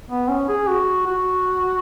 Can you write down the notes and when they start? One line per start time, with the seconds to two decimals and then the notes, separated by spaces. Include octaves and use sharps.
0.09 B3
0.29 C#4
0.49 G#4
0.68 F#4
1.07 F#4